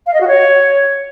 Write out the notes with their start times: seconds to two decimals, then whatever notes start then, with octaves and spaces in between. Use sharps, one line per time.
0.07 F5
0.14 D#5
0.21 F#4
0.28 C#5